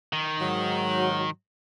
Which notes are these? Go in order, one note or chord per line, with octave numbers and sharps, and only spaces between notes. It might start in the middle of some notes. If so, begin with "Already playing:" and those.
D#3
G#2 F#3